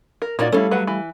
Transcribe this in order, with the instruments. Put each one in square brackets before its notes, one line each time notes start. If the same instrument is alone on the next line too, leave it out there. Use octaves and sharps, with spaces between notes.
[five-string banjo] A#4
[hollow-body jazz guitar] A#2 [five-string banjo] A#3 D#4 F#4 [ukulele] F4 C#5 D5
[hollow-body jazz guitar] G3 A3 [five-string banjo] C#4 E4 [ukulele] A4 F5
[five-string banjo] F#3 B4 F#5
E3